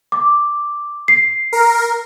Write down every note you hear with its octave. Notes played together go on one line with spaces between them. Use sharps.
D6
C7
A#4